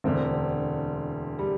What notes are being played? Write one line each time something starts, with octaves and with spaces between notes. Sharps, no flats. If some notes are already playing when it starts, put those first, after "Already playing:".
E1 D2 D3 C4
G3